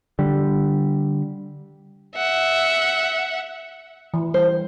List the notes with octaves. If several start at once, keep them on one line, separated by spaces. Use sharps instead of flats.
D3 G3
E5 F#5
E3
G3 C5